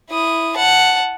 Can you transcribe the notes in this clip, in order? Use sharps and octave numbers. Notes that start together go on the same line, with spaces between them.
E4 D#6
F#5 A5